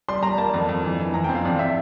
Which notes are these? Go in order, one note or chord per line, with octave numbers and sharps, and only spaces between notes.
G3 C6
G3 A#5
A#3 A5
F2
F2
E3
E3
F2 A#5
C4 G5
F5
F2 D5
E5